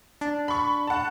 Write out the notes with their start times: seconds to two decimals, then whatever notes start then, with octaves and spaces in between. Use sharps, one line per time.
0.21 D4
0.48 B5 C#6
0.87 F#5 A5